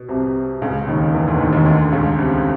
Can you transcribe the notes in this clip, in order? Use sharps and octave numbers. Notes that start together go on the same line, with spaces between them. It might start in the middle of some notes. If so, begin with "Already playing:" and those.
Already playing: B2
C2 C3
C#2 C#3
D#2 D#3
E2 E3
D2 D3
D#2 D#3
D#2 D#3
D2 D3
C#2 C#3
C2 C3